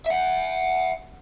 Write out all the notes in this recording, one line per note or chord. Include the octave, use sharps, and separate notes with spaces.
E5 F#5